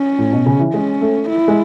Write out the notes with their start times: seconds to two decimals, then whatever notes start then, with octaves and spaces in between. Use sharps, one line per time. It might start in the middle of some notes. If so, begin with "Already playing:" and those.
Already playing: C#4
0.18 A2
0.32 B2
0.46 C#3
0.59 E3
0.74 G#3 C#4
1.01 A3
1.29 E4
1.48 G#3